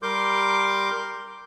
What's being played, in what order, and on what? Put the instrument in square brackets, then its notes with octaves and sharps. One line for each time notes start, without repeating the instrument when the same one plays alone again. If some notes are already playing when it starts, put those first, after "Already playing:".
[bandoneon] G3 A#4 C6 D6 G6